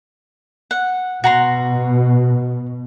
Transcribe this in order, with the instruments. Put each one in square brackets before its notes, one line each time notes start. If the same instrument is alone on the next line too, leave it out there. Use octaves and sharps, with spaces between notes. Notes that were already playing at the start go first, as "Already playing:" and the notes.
[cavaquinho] F#5
[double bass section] B2 [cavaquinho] F#4 A#5 C6